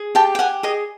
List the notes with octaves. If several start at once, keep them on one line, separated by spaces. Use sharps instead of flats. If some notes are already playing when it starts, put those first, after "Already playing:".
Already playing: G#4
G4 G5 A5
G5
G4 F#5 G#5
G#4 D#5